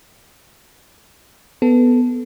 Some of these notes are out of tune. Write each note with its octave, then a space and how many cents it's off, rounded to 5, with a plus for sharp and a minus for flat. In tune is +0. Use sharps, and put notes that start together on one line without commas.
B3 +0 A4 +0